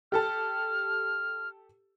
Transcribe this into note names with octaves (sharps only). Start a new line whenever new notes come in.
G4 A4 A5 F6